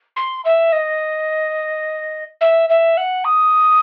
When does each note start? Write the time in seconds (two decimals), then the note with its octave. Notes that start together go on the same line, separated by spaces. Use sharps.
0.16 C6
0.45 E5
0.72 D#5
2.41 E5
2.69 E5
2.97 F#5
3.25 D#6